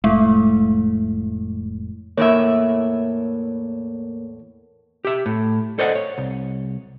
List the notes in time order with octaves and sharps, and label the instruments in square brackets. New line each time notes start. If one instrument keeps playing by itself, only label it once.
[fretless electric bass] F1 A2 [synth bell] G#3 A3
[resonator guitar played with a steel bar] E2 A2 E5 [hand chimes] A#3 A#4 C#5
[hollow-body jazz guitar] G4 E5
A2
A4 C5 D5 D#5 F5 F#5
C#5
C2